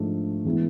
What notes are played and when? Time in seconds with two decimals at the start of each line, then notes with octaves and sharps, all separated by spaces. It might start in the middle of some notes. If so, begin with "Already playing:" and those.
Already playing: G#2 F3 A3 D4
0.45 E3 G#3 B3 E4